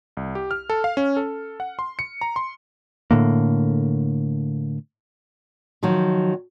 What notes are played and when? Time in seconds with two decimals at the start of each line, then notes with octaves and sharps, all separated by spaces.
0.17 C2
0.35 G4
0.51 F6
0.70 A4
0.84 F5
0.97 C#4
1.17 A4
1.60 F#5
1.79 C6
1.99 C#7
2.21 A#5
2.36 C6
3.11 A2 D3 A#3
5.83 D#3 F3 F#3